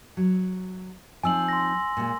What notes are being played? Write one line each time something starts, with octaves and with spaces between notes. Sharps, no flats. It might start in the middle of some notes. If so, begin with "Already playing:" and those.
F#3
F3 C4 D#4 G#5 E6 F#7
C6 A#6
A#2 G#3